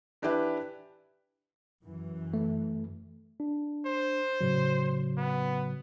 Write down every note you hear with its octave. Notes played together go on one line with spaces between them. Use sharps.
E3 D4 E4 G4 B4 E5
F#2 E3
A3
D4
C5
A2 C#3 F#3
B3